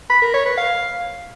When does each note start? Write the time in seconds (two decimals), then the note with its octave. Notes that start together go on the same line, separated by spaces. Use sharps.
0.10 B5
0.22 A#4
0.34 C#5
0.46 B4
0.57 F5